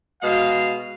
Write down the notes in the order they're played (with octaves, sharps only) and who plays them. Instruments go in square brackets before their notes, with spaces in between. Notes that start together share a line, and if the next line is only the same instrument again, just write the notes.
[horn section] B2 G#3 D#5 F5